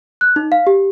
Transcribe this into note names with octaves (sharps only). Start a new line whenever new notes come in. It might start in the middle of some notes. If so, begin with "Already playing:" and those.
F#6
D#4
F5
G4